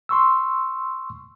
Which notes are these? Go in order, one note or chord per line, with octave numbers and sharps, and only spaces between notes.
C6 C#6 E6